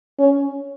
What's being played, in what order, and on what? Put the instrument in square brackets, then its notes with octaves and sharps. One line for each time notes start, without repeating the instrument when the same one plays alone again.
[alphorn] C#4